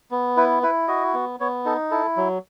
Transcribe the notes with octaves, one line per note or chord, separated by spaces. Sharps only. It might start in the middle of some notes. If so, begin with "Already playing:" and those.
B3
E4 B4
E4 B4
F#4 D#5
B3
B3 C#5
D#4 A4
E4 A4
F#3